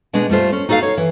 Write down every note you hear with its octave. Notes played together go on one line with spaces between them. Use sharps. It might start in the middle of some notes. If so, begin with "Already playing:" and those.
B2 G#3 D4
G3 A3 F4 C5
C#4
D#4 F#4 A4 E5 F5
C#5
E3